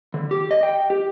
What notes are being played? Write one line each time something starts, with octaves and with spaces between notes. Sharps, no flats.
D3
G4
D#5
G5
G4